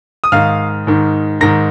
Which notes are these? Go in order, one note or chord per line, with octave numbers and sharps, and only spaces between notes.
D#6
G#2 D#3 F5 F6
G#2 D#3
G#2 D#3 A#5 A#6